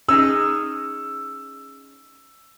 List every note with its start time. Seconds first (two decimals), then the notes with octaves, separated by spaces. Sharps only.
0.09 C#4 D#4 G#4 E6